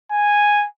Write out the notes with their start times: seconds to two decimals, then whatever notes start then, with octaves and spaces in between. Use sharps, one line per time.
0.12 G#5